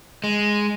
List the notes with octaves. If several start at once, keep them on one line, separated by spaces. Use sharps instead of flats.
G#3